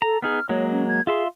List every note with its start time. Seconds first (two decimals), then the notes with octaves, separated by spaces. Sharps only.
0.02 A4 A#5
0.22 B3 D#4 G#4 F6
0.49 F#3 G#3 A#3 C#5
0.71 C#4
0.88 G#6
1.07 F4 G#4 E5 C6